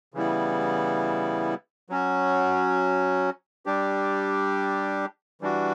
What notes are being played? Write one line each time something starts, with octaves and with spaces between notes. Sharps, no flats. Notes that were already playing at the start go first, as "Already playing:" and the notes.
C#3 E3 G3 B3 E4
F#3 C#4 F#4
G3 D4 G4
E3 G3 D4 F#4